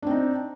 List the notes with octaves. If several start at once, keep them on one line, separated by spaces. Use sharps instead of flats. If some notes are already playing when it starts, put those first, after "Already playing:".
C4 D4 D#4